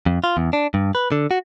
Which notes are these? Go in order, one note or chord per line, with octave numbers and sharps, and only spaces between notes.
F2
F4
E2
D4
G2
B4
D3
F#4